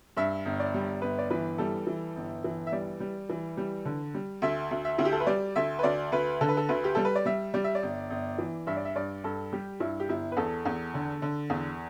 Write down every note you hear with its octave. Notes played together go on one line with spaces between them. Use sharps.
G2 E5
G1
D5
G3
G1 B4
D5
E3 B4
G3 A4
E3
G1
E3
E5
G3 D5
G3
E3
G3
D3
G3
D2 E5
D2
E5
D2 E4
G4
A4
B4
G3 D5
D2 E5
B4
D2 D5
D2 B4
D3 A4
B4
A4
D2 B4
G4
G3 A4
B4
D5
G3 E5
G3 D5
E5
D5
G1
G1
E3
G2 E5
D5
E5
G2 D5
G2 A4
G3 G4
G2 E4
G4
G1 E4
B4
E2 A4
E2
D3
D3
E2